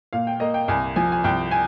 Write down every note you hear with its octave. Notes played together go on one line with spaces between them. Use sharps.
A#2 F5
G5
A#3 D#5
G5
C2 G#5
F3 G#5
G#5
C2 G5
G#5